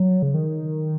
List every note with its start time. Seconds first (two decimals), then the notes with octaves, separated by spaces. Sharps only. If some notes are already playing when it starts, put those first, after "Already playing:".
Already playing: F#3
0.22 C#3
0.34 D#3